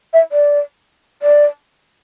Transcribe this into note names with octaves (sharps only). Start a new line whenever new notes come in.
E5
D5
D5